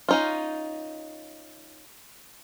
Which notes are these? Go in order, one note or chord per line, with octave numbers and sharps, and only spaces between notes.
C#4 D#4 F4